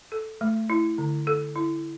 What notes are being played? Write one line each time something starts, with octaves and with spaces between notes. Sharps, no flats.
A4
A3
E4
D3
A4
E4